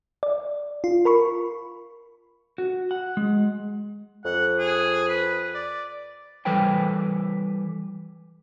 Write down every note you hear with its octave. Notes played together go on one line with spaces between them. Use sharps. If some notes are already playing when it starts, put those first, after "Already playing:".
D5
F4
A#4 B5 C#6
F#4
F#5
G#3
F2 F#5
G#4
B4
D5
E3 G3 A4 B4 C#5 G5